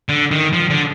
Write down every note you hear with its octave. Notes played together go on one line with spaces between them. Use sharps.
D3
D#3
F3
D3